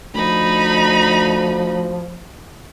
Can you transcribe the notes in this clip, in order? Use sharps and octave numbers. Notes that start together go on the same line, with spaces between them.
D2 F3 D#4 B5